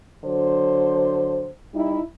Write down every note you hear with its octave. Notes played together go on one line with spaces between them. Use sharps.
D3 F#3 C5
G3 D#4 E4